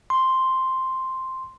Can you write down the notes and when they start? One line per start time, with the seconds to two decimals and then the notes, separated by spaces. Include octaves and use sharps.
0.10 C6